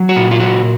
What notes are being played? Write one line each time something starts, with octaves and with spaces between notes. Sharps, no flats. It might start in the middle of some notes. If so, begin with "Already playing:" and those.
Already playing: F#3
F#4
A#2
F4
F#3 F#4